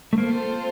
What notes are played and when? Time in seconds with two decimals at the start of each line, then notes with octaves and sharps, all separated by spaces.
0.13 A3
0.18 A#3 C4 F4 A4 C5